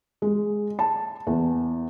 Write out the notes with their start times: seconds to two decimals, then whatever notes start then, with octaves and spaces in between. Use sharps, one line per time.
0.22 G#3
0.79 A5
1.27 E2